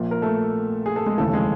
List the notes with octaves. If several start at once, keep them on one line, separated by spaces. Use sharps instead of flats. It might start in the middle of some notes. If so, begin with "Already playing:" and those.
Already playing: A#1 A#2
A#4
A3 A4
G#4
A4
G#3 G#4
F1 D#2 C#3 E3 A3 A4
A4
G#3 G#4